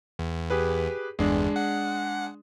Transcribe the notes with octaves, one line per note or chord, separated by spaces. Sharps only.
E2
G4 G#4 B4
G1 E2 G#3 D4
F#5